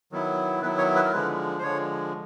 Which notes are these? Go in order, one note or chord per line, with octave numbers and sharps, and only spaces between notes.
D#3 F#3 B3 E4
D#3 F#3 B3 E4 B4
C#5
B4
A#4
D3 F3 G#3 B4
C5
D3 F3 G#3 C#5